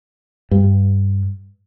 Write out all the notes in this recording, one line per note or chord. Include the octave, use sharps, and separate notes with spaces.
G2